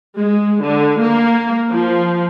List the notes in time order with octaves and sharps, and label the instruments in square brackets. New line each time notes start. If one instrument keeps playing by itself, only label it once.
[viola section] G#3
D3
A#3
F3